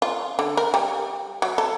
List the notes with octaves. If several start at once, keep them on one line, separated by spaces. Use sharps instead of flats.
F4
D3
A#4
G3
F#3
A4